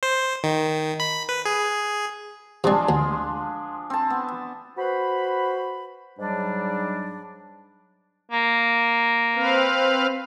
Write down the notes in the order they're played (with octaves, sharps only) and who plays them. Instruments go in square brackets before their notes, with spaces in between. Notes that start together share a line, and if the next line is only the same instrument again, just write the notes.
[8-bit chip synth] C5
D#3
B5
B4
G#4
[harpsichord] C3 G3 [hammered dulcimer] F3 G#3 D4
[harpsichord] D2
[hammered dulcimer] C4 A5
B3
[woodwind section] F#4 B4 C5 B5
G#2 F#3 G3 D4
[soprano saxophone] A#3
[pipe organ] C4 B4 F5